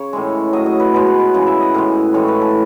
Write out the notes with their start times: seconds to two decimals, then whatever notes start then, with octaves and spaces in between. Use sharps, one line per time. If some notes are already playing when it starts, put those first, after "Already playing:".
Already playing: C#3 C#5
0.13 A2 E3 G#3
0.53 A2 F#3 D#5
0.66 D#5
0.80 B4
0.94 B2 G#3 B4
1.07 G#4
1.20 B4
1.34 C#3 E3 G#3
1.47 E5
1.60 D#5
1.74 A2 E3 G#3
2.14 A2 E3 G#3 C#5
2.28 B4
2.41 A4